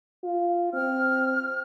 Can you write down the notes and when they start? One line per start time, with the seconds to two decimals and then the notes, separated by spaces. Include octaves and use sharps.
0.24 F4
0.74 C4 F6